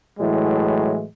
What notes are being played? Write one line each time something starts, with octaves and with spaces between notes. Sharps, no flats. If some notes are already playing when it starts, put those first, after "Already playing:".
A2 E3 F#3 G#3